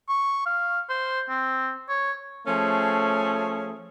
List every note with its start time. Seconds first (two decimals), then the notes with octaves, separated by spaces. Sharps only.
0.09 C#6
0.46 F5
0.89 C5
1.29 C4
1.89 C#5
2.47 F3 A3 C#4 G#4